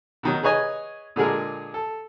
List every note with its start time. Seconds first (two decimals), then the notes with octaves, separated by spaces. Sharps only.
0.23 B2 D#3 F#3
0.43 G#4 B4 C#5 D#5 G#5
1.16 A#2 D3 G#3 G#4 A#4
1.74 A4